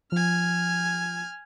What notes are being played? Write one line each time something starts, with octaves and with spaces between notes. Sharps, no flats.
F3 G#5 F6